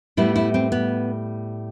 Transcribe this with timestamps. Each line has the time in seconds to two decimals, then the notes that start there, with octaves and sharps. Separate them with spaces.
0.17 A2 G3 B3 E4
0.36 E4
0.54 C4
0.72 B3